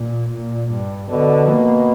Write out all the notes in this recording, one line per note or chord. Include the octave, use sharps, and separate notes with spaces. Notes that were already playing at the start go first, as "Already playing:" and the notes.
Already playing: A#2
A#2
G2
B2 D3
A#3